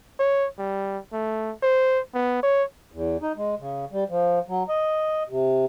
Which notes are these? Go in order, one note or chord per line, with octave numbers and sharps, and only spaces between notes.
C#5
G3
A3
C5
B3
C#5
E2
D#4
G#3
C#3
G3
F3
F#3
D#5
C3